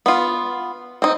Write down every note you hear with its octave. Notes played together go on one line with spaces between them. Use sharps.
B3 F4
C4 D#4